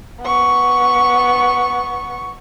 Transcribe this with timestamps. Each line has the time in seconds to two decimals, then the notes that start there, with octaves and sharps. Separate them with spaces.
0.21 B3 C#6